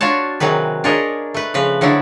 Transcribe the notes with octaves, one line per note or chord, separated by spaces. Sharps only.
D4 F4 F#4 C#5 A5
C3 D#3 F#3 G#4 B4
D4 F4 G#4 A#4 C#5 D#5
A3 B4
C#3 F3 B4
D3 F3 F#3 D4 E4